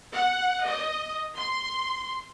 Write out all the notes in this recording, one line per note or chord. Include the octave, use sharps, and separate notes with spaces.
F#5
D#5
C6